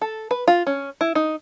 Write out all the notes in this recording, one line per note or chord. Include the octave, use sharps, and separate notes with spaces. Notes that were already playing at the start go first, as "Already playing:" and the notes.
A4
B4
F4
C#4
E4
D#4